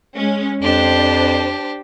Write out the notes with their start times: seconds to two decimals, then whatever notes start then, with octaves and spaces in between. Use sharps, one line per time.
0.16 G#3 C#4
0.63 F2 D4 G4 C5